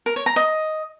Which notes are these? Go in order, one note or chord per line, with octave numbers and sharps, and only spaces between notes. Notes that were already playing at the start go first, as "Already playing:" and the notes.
A#4
C#5
A#5
D#5